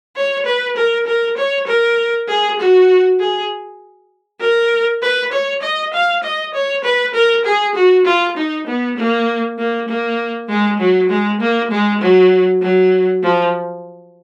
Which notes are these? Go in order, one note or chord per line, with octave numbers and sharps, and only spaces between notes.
C#5
B4
A#4
A#4
C#5
A#4
G#4
F#4
G#4
A#4
B4
C#5
D#5
F5
D#5
C#5
B4
A#4
G#4
F#4
F4
D#4
B3
A#3
A#3
A#3
G#3
F#3
G#3
A#3
G#3
F#3
F#3
F3